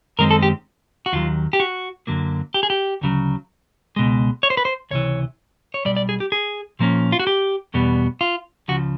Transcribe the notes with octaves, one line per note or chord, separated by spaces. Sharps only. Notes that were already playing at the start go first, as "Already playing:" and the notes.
F#2 D#3 G#3 C4 A#4
A4
G4
F#4
D#2 D#3 F#3 F4
G4
F#4
F#2 D3 F#3 A#3
G4
G#4
G4
D2 C#3 F#3
C#2 B2 G#3
C#5
C5
B4
C5
C#2 C3 E3 C#5
C#5
B1 B2 G3 D5
D5
G#4
G4
G#4
A#2 F3 A#3 C#4
F4
F#4
G4
E2 B2 G3 B3
F4
C#2 C#3 F3 F#4